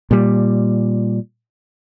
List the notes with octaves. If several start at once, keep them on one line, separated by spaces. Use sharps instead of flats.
A#2 G3